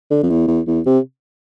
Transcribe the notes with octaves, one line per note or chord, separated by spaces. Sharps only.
D3
F2
E2
E2
E2
C3